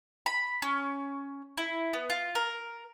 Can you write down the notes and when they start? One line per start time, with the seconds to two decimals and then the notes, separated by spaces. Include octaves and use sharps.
0.26 B5
0.62 C#4
1.57 E4
1.93 B3
2.10 F4
2.35 A#4